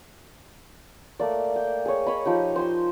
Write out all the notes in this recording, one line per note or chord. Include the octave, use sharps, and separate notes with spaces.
A3 A#3 D5
G5
G#4 C#5
C#5 D#5 B5
F3 D#4 G4
C5 G#5 C6